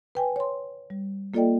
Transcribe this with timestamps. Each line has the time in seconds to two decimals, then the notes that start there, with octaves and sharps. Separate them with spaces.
0.15 B4 G5 G#5
0.36 C#5 C6
0.90 G3
1.34 A#3 F4 A4 D5 D#5 G5